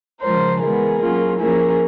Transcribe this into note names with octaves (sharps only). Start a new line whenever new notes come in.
C#3 F3 G#3 A#4 C5
E3 G#3 B3 G#4 A#4
F#3 A#3 C#4 F4
F3 A#3 C#4 E4 G#4 A#4